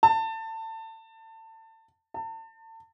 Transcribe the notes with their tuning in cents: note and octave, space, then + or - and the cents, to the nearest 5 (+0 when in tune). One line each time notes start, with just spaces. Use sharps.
A5 +25
A5 +35